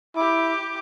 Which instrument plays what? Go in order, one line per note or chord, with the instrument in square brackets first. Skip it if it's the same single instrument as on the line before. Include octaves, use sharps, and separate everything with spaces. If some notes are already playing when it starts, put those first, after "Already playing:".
[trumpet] E4 [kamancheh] G4 D6